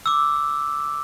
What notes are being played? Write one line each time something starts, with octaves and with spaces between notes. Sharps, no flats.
D6 E6